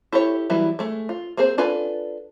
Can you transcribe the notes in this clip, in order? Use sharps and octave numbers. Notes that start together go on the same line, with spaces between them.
E4 G4 A4 C#5
E3 F#3 G3 B3 E4
G#3 A3
F4
A#3 C4 G#4 C5
D4 F4 A4 B4 G#5